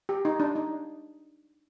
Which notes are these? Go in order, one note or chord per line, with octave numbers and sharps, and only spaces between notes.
G4
D#4
D4
D#4